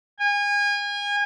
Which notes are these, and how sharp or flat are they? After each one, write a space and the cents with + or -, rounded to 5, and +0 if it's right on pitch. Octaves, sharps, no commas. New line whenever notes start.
G#5 -30